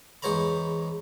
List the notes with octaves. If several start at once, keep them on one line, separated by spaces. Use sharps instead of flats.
E2 G#3 C5 C#5 A#5 B5